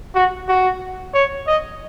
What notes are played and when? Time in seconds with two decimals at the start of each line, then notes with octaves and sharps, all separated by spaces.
0.15 F#4
0.48 F#4
1.14 C#5
1.47 D#5